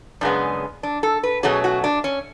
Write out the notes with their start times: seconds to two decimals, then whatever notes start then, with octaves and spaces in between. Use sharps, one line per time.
0.21 F#2 C#3 G#3 B3 D4
0.83 D4
1.03 A4
1.23 B4
1.43 B2 F#3 A3 C#4 G#4
1.64 F#4
1.84 D4
2.04 C#4